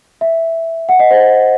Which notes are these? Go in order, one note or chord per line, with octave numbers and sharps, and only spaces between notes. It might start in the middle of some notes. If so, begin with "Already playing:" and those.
E5
F#5
D#5
C5